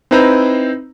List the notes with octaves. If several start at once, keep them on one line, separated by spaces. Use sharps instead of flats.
C4 D#4 E4 B4 C5 A#5